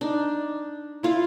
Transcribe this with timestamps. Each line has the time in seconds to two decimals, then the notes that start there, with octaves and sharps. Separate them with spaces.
0.01 D4 D#4
1.03 E4 F4 F5